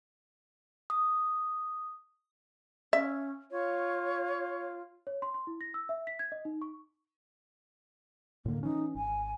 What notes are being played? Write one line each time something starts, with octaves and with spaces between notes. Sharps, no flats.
D#6
C#4 E5
F4 C#5
C#5
C6
C6
E4
A#6
E6
E5
B6
G#6
D#5
D#4
C#6
A2 D3 A#3
E3 C#4 D#4
G#1 G#5